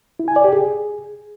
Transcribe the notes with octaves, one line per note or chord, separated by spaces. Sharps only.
E4
G#5
D5
G4
G#4